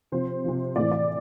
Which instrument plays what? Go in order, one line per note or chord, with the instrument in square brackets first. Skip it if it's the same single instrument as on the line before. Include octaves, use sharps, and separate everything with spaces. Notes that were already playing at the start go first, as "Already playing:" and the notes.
[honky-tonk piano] C3 F3 C5
C3 F3
A2 E3 D5
D5